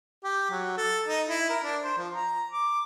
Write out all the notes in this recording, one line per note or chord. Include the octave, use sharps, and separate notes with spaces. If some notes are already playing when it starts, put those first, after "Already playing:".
G4
F#3
A4
D#4
E4
A#4
D4
C5
F3
A#5
D6